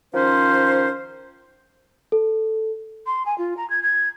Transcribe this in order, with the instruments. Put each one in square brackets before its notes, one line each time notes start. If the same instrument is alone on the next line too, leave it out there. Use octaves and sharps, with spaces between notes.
[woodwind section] D#3 F3 C#4 C5
[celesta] A4
[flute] C6
G#5
F4
A#5
G#6
G#6